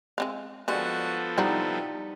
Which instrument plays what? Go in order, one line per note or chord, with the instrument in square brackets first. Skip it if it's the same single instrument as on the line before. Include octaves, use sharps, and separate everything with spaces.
[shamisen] G#3 C4 F5
[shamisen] D3 G3 G#3 [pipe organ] F3 B3 A4 [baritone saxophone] F#4
[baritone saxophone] C3 [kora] G3 D#4 [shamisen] E4 F#4 C5